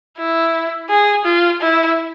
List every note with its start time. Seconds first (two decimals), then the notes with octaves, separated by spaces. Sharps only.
0.18 E4
0.89 G#4
1.25 F4
1.61 E4